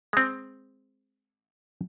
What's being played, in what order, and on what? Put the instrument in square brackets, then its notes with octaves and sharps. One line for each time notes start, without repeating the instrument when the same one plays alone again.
[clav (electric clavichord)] G#3 C4